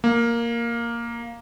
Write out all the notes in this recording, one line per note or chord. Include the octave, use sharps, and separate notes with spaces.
A#3